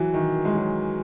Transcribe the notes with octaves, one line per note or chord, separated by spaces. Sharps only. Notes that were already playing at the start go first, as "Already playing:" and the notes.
Already playing: E3 F#3 F#4
D#3
G#3
F#3